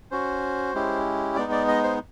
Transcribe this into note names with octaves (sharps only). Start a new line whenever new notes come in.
C#4 F#4 C5
G#3 C#4 E4 G4
G#3 B3 D#4 D5
D5
D#5
C5